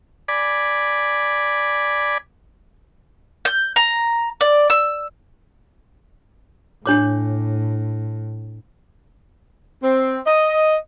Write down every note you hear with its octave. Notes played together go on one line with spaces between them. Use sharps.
D5 G#5 B5
G6
A#5
D5
E6
A2 D4 C#5 D6
C4
D#5